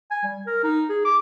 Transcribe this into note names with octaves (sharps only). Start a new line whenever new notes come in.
G#5
G3
A#4
D#4
G#4
D6